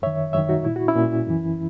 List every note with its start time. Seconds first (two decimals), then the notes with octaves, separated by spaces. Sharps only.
0.02 F#2 D#3 C#5 E5
0.33 F#2 D#3 C#5 E5
0.49 D#4 F#4
0.64 A#2 E4
0.76 F#4
0.88 C#4 E4
0.95 A#2
1.27 F#2 E3